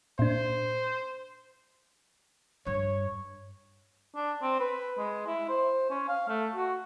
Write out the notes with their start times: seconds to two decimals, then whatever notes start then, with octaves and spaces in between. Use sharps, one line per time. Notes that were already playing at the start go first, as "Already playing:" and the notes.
0.19 A#2 D4 C5
2.66 G2 C#5
4.15 D4
4.42 C4
4.60 B4
4.98 G#3
5.27 E4
5.49 C5
5.90 C#4
6.08 F5
6.28 A3
6.55 F#4